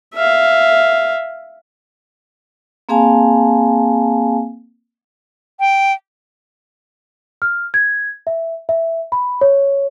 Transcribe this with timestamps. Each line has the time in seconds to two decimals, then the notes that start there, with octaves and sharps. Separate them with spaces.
0.14 E5 F5
2.89 A#3 C4 G#4 F5 G#5 A5
5.60 G5
7.42 F6
7.74 G#6
8.27 E5
8.69 E5
9.12 B5
9.41 C#5